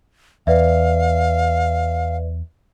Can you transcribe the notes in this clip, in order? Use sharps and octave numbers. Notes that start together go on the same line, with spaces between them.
E2 B4 D5 E5 F5